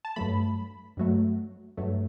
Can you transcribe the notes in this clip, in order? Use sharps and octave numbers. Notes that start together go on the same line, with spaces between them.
A5
G2 F#3 A3 B5
G2 F#3 A3
G2 F#3 A3